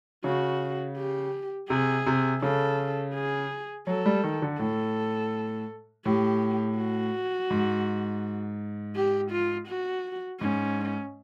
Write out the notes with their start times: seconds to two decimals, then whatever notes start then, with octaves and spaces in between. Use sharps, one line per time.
0.24 C#3 F#4
0.97 G4
1.69 C3 G#4
2.06 C3
2.42 C#3 A4
3.14 G#4
3.87 F#3 A4
4.06 G3
4.24 D#3
4.42 D3
4.59 A2 A4
6.05 A2 G4
6.78 F#4
7.50 G#2
8.95 G4
9.32 F4
9.68 F#4
10.40 G#2 C#4